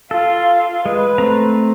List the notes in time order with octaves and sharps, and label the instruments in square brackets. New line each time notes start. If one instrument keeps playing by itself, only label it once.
[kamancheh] F4 F5 [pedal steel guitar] A4
[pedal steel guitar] G#3 [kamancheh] B4
[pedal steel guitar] A3 C4 A#5